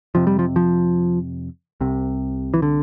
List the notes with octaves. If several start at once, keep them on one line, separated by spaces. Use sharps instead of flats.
F2 C3 F3
G3
F3
F3
C2 C3
E3
D3